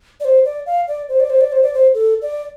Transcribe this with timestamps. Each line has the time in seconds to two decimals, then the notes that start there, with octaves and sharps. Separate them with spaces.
0.20 D5
0.25 C5
0.45 D5
0.66 F5
0.88 D5
1.09 C5
1.20 D5
1.30 C5
1.41 D5
1.52 C5
1.63 D5
1.74 C5
1.94 A4
2.22 D5